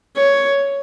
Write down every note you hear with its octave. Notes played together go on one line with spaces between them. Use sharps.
C#5